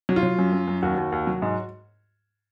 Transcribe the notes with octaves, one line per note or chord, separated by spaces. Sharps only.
F#3
F4
F#3
F#2
F#2
F#2
D#2 F#4
D#2
D#2
F#3
G#2